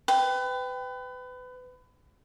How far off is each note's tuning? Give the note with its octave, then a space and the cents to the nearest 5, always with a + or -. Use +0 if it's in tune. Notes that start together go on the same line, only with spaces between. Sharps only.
B4 +30 G5 +0